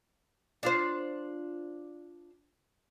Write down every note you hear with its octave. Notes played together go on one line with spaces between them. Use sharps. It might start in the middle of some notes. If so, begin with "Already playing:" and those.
D4 F4 C5